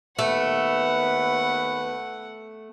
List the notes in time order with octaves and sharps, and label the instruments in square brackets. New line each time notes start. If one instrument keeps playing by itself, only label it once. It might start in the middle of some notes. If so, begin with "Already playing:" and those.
[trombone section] D#2 B3 B4 [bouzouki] A3 [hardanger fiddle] F#5